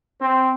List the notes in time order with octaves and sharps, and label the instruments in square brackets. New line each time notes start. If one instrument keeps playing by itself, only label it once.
[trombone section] C4